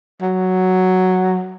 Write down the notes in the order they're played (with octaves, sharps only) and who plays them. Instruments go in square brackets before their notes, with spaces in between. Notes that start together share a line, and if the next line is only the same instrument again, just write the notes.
[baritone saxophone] F#3